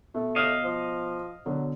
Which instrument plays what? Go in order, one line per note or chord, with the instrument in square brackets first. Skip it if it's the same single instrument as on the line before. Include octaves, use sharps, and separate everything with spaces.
[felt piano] B2 [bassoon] A3
[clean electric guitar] D#5 F5
[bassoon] F3
[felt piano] B2 D3 [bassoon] F#3